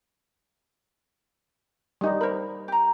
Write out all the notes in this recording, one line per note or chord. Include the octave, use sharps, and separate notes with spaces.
G3 D#4
A#4 C5 B5
G4 A#5